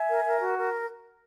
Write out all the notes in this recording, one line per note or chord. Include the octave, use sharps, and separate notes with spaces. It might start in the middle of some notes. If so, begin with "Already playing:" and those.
Already playing: E5 G#5
A#4
A#4
F#4
A#4